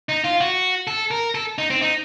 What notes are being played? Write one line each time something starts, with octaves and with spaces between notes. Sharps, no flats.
D#4
F4
F#4
A4
A#4
A4
D#4
C4
D#4